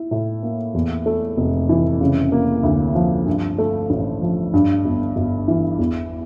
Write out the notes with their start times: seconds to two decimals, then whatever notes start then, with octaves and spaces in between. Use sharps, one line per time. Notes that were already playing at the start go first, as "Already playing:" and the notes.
Already playing: E4
0.11 A2
0.43 A#3
0.74 E2
1.06 A3
1.37 F1
1.69 E3
2.01 C#3
2.32 A#3
2.63 D2
2.95 F3
3.27 G2
3.58 A3
3.90 A1
4.22 F3
4.53 G2
4.85 G1
5.16 G1
5.48 E3
5.79 E2